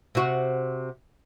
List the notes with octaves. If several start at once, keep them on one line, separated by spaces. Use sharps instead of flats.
C3 F#4